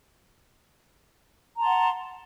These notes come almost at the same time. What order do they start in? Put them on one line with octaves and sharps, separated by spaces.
A#5 A5 C6 F#5